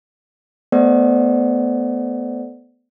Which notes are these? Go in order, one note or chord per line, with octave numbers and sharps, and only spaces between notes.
A3 B3 A4 C5 D5 F#5